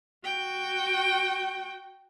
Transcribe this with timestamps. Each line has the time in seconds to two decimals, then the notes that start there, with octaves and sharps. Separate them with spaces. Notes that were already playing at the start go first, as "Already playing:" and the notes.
0.25 F#4 G5